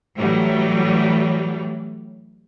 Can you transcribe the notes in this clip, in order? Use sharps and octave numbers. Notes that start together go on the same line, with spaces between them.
A2 E3 F#3 G3